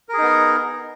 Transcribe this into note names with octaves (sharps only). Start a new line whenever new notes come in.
B3 D#4 G#4 A#4